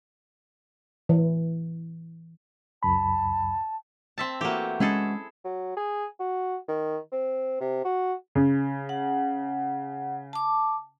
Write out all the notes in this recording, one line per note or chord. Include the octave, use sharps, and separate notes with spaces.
E3
C#2 F#2 A5 B5
C4 E5 A5
E3 A3 A#3 F#4 G4
G#3 C#4 E4 G#4 A4
F#3
G#4
F#4
D#3
C4
C3
F#4
C#3
F#5
A5 D6